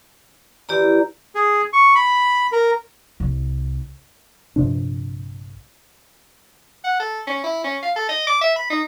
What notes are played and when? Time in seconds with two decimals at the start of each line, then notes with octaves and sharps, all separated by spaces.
0.69 E3 G4 D5 A#5
1.35 G#4
1.73 C#6
1.95 B5
2.52 A#4
3.20 C2
4.56 A#1 G2 C3 D4
6.84 F#5
7.00 A4
7.27 C#4
7.44 E4
7.64 C#4
7.83 F5
7.96 A4
8.09 D#5
8.27 D6
8.41 E5
8.56 B5
8.70 D#4